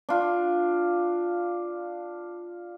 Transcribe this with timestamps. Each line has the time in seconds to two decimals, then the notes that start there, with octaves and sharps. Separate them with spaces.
0.09 D4 F4